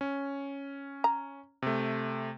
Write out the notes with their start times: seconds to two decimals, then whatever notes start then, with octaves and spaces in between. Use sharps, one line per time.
0.01 C#4
1.04 A#5
1.62 C3 A3